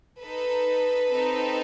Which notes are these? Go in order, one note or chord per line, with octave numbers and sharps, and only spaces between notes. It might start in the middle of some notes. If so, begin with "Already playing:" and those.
D#4 A4 B4
C4 D#4 A4